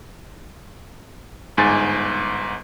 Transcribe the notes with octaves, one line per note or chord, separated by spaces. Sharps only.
G1 G#2 G#5 A6